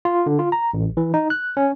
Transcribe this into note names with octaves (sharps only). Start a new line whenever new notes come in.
F4
D3
F4
A#5
A1
E3
D#4
F#6
C#4